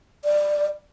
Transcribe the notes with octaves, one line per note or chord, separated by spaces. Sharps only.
D5